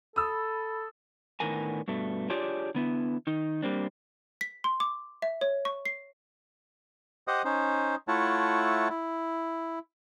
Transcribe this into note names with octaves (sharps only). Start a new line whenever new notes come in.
A4 B5 D#6 E6
A2 D3 D#3 B3 A#4 G#5
G2 B2 A3
D4 F4 G4 G#4 C#5 D5
D3 B3 E4
D#3 D#4
G3 A#3 C4 D4
B6
C6
D6
E5
C#5
C#6
C7
G4 C5 D#5 F#5 D#6
C#4 D#4 C5
A3 E4 F4 C#5 F#5 A5
E4